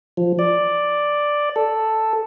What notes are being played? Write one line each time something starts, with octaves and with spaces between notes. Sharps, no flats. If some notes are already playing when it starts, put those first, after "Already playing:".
F3
D5
A4